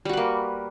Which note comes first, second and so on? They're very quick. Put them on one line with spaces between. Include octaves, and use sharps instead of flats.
G3 F#4 B4 A#3